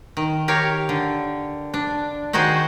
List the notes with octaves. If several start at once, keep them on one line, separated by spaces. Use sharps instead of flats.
D#3
G4 A#4 C#5 F5
D3
D4
D#3 D#4 F#4 G#4 C5